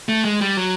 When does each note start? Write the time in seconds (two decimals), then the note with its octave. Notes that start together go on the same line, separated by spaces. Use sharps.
0.09 A3
0.25 G#3
0.41 G3
0.57 F#3